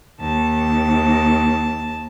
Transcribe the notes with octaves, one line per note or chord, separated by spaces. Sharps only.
D#2 A5